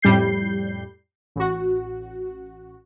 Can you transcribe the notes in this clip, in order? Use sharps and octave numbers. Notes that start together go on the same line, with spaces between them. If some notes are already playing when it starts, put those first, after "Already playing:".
F2 A2 G3 G6 C7
A1 F#4